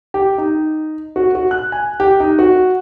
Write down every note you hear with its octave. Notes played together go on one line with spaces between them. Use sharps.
G4
D#4
F#4
F#4
F#6
G#5
G4
D#4
F#4